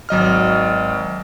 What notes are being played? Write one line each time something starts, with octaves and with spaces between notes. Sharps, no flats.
G#1 F#3 D#5 F6